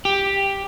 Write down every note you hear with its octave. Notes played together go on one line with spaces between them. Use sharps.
G4